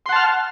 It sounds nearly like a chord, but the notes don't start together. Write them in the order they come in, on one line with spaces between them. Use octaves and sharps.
C6 F#5 A5 F6